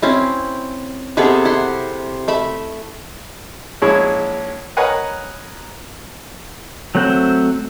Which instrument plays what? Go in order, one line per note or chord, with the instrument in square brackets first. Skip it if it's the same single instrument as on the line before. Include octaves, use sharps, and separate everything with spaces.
[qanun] C4 C#4 E4
C3 B3 G#4 A4
E4 F#5 C6
A3 E5 B5
[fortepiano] A#1 G#3 C#4 E4 C#5
A#4 B4 C#5 D#5 F#5 G#5
[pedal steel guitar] F#3 A3 C4 C5 F#5